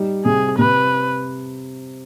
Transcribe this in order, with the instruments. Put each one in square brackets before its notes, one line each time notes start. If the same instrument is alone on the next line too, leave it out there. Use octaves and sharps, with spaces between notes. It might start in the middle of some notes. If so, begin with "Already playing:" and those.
Already playing: [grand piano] G3 D#4
[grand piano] C3 [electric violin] G#4
[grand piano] C3 [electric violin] B4